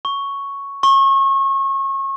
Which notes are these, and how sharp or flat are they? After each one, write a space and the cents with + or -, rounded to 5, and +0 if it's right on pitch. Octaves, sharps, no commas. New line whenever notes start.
C#6 +0
C#6 -30